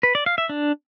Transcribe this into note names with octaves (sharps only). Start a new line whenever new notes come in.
B4
D5
F5
E5
D4